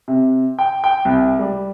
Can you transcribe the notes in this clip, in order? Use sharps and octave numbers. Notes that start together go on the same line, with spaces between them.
C3
G5
G5
C2
G3